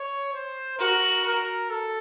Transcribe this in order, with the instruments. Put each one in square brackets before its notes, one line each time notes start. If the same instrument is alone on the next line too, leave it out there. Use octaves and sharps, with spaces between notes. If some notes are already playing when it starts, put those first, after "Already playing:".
Already playing: [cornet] C#5
C5
[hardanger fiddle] F#4 [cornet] A#4
[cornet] A#4
A4